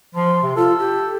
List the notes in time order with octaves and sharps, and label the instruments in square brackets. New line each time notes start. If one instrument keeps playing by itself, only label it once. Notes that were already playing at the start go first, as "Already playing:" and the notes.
[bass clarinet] F3 [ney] C6
[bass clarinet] C3
[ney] F4 [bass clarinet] A4
[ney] G4